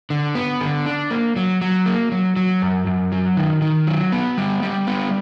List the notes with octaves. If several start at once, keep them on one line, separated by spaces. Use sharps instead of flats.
D3
B3
D3
D4
A#3
F#3
F#3
A#3
F#3
F#3
F#2
F#2
F#3
D#3
D#3
F#3
B3
G3
G3
B3